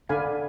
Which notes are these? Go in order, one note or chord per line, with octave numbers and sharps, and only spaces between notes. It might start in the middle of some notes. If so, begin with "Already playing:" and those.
D3 A4 D5 F5 G#5 B5